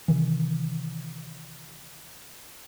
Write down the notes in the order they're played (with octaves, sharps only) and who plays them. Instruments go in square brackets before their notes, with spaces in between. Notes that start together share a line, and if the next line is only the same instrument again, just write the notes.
[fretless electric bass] C3 D#3 E3